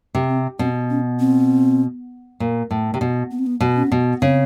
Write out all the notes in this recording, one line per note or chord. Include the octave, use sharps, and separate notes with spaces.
C3
C4
B2 C4
C#4
C4
A#2
A2
C3
B2
B3
C4
B3
B2
C#4
B2
C#3 C4